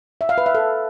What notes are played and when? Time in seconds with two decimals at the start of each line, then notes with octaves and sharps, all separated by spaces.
0.21 E5
0.29 F5
0.38 B4
0.46 E5
0.55 A4